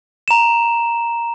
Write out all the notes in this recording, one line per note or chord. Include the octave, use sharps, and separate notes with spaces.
A#5 E7